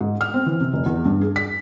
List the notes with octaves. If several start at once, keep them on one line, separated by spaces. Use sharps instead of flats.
G#2
F6
C4
E3
C3
F1
E2
G2
G#4
B6